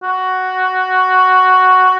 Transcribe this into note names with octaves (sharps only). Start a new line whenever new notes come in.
F#4